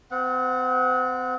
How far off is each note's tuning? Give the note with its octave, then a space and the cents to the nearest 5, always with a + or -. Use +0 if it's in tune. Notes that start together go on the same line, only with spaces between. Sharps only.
C4 -35 F#5 -15